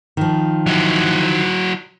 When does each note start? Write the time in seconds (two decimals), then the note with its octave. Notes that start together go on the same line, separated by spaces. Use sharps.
0.17 D#3 F3
0.67 F#3 E4